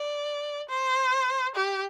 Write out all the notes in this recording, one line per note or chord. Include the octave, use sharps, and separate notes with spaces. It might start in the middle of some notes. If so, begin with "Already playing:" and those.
Already playing: D5
C5
G4